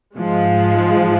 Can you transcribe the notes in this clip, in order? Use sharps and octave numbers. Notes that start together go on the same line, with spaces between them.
G#2 F3 G#3